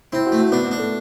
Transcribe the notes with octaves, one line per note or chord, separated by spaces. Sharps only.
C4 E4
F#4
A3
F#4
B3 D4
B3
D4
A3